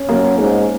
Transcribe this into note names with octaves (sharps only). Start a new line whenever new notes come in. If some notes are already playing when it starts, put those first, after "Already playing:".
Already playing: C#4
F#2 A#3
G#2 C#4